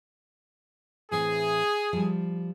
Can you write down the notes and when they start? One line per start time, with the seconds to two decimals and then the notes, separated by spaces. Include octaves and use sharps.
1.11 A2 E3 C4 G#4
1.93 F3 G3